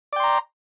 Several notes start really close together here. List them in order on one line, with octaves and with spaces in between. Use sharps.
D5 G5 C6 A#5